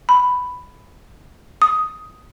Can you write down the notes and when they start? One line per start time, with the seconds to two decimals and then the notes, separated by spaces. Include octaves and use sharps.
0.09 B5
1.62 D#6